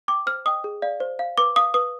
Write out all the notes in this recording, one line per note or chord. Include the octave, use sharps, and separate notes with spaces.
G5 D6
C5 F6
D#5 G5 D#6
G#4
D5 F5
C5
F5
B4 D6
F5 D#6
B4 D#6